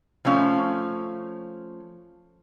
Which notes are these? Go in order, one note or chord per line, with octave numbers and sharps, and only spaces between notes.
F3 A3 C#4 F5